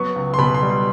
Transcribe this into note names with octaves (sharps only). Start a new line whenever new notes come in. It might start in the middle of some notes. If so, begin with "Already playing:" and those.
Already playing: F#3 B3 C#6
C#2
C6
B2 B5
C6
G3
C6